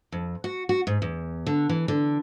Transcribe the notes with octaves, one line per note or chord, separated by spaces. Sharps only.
F2
F#4
F#4
G#2
E2
D3
E3
D3